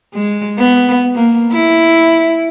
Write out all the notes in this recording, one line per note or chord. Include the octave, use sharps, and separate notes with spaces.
G#3
B3
A#3
E4